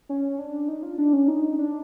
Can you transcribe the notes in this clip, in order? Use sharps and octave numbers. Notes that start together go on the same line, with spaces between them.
C#4
D4
D#4
F4
D4
C#4
D#4
D4